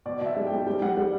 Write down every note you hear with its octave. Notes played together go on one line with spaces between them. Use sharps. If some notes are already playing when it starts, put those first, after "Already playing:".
B2 D5
B2 E5
G3
G3 G5
G3 G5
G3 F#5
G3 F#5